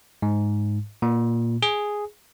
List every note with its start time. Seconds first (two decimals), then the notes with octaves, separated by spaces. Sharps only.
0.22 G#2
1.02 A#2
1.63 G#4